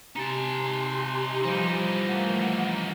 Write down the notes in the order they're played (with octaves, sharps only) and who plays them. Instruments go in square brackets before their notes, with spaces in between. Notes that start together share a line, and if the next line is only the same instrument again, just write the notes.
[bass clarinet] C3 [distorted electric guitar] D#4 A5 [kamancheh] G#5 C6
[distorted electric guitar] E3 D#4 [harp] F3 G3 G4
[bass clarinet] A3 [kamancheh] A#3 F#5